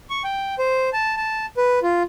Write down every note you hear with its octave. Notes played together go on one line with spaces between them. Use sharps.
C#6
G5
C5
A5
A5
B4
F4